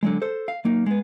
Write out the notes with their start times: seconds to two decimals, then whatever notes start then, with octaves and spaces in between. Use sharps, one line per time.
0.03 D3 F#3 G#3
0.22 A4 C5
0.48 F5
0.65 F#3 A#3 D#4
0.86 G#3 B3